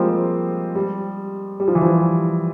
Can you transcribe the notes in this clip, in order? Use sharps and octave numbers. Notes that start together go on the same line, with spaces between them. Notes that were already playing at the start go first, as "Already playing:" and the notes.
Already playing: F3 G3 G#3 A#3 C4
G3
G3
F3
E3
F3